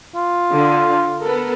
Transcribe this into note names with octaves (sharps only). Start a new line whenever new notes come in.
F4
D3
B3 A4 A#4